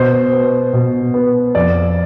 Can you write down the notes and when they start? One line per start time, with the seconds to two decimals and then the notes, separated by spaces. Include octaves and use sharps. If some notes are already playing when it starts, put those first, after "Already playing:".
Already playing: B2 C5
0.33 B3
0.73 B2
1.14 B3
1.55 F2 D5